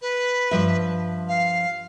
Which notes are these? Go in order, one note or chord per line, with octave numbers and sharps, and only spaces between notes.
B4
G2 F3 E5
F5